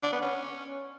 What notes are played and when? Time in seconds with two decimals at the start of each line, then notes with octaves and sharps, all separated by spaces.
0.03 D4
0.12 B3
0.22 C#4